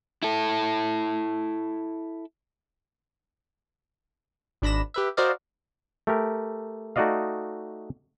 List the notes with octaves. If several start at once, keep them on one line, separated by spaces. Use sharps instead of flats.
E4 A4
G#1 D4 B5 A#6 E7
G4 B4 E5
F#4 A#4 C5 D5 D#5 F5
A3 G4 A#4
A3 D#4 F#4 D5 D#5 F5